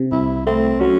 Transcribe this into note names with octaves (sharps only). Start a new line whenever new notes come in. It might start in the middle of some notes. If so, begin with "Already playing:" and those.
Already playing: C3
C2 E4
A3 C4
F#3 C#4